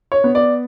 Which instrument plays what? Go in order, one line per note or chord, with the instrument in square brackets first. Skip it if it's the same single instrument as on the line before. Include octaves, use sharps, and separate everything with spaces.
[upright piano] C#5
B3
D5